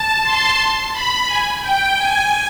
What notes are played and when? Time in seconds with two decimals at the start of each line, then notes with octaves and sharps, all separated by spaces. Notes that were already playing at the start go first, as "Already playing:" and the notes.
Already playing: A5
0.23 C6
0.92 B5
1.26 G#5
1.61 G5
1.96 G#5